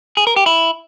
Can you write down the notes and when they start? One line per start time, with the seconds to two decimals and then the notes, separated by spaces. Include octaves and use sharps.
0.17 G#4
0.27 A#4
0.36 G4
0.46 E4